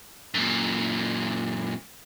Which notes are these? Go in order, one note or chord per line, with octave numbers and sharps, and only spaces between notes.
F#2 A#2